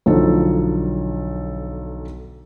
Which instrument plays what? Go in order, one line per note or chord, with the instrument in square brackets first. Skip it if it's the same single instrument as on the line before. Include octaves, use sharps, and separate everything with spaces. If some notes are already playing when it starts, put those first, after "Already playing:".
[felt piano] B1 D3 F3 D#4 A4